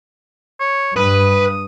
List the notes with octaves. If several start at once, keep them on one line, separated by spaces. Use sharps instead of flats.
C#5
G2 B4 D#6